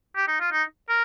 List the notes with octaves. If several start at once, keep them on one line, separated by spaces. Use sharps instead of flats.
G4
D#4
F4
D#4
A#4